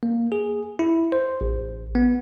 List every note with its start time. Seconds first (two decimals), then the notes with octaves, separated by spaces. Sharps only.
0.03 A#3
0.32 G#4
0.79 E4
1.12 C5
1.41 A1
1.95 B3